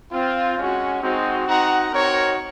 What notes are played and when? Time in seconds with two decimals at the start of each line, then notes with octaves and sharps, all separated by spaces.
0.11 C4 F4
0.56 G#3 C#4 F#4
1.01 G#3 C4 D#4 F#4
1.46 C4 D#4 F#4 F#5 A#5
1.92 C4 D#4 F#4 A#4 C#5